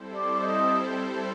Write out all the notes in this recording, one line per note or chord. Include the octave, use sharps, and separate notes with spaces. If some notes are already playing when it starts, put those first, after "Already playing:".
Already playing: G3 C4 E4 A4 C5
D5
D#5